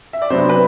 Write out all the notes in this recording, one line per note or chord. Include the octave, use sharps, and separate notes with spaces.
E5
D5
C3 F#3 B3 D4 C5
B4